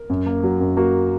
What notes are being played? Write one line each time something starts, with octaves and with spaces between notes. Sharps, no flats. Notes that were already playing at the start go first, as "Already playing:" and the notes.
Already playing: A#4
F#2
A#3
F#3
F#2
A#3 F#4